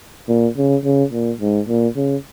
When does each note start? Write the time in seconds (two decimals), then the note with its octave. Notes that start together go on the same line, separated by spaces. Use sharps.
0.28 A#2
0.57 C#3
0.84 C#3
1.12 A#2
1.40 G#2
1.68 A#2
1.96 C#3